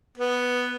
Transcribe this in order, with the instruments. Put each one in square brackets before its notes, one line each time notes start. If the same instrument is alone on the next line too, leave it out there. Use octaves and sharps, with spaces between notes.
[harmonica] B3